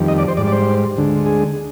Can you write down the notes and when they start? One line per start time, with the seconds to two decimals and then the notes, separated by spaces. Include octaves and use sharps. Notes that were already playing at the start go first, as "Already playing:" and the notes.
Already playing: F2 D#3 G3
0.08 D#5
0.18 D5
0.28 C5
0.37 G#2 G3 D5
0.47 D5
0.52 C5
0.97 D2 D3 G#3
1.26 G#4